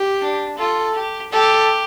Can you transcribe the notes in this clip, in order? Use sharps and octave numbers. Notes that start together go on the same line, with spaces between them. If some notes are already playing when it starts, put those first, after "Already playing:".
Already playing: G4
D4
F4 A4
G4
G4 A4